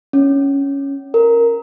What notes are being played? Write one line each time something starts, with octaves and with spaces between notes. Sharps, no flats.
C#4
A#4